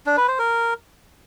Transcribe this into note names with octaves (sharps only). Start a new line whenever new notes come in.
D4
B4
C5
A#4